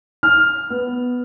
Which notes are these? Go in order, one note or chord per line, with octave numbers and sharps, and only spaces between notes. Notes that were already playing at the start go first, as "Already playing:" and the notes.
F6
B3